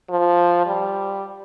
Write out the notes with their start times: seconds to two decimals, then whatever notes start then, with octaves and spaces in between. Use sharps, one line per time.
0.10 F3
0.66 G3